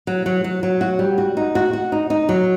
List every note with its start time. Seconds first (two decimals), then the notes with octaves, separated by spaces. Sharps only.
0.07 F#3
0.26 F#3
0.44 F#3
0.63 F#3
0.81 F#4
0.99 G3
1.18 F#4
1.37 D#4
1.55 F#4
1.73 F#4
1.92 D#4
2.10 D#4
2.29 F#3